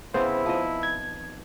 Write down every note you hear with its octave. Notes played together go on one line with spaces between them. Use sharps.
C#3 B3 C4 E4 C5
F3 D#4 D#5
G#6